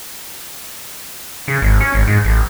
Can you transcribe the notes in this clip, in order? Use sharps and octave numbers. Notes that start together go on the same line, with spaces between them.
C#3
G#1
C#4
G#1
G#2
A1